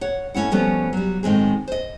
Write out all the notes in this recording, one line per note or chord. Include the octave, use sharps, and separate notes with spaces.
C#5 F#5
A3 C#4 E4 F#5
F3 G3 A3 B3 C#4 F#4
F#3 G3
A2 D#3 G#3 C4 G#4
C5 D#5